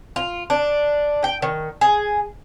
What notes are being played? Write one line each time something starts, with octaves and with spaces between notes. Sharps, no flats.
F4
D4
G5
D#3
G#4